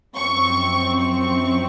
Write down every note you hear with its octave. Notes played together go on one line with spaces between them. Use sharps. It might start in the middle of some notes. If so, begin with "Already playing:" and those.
F#2 F3 C4 C#6
C#6